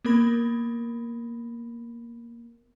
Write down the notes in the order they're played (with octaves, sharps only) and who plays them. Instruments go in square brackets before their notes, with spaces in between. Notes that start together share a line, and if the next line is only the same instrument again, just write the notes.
[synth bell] A#3 B3 A#4 B5 A#6